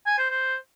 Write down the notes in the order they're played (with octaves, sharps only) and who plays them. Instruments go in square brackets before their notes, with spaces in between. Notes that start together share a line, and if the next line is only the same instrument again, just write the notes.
[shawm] G#5
C5
C5